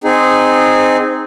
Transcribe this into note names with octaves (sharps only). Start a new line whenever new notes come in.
C4 D#4 G#4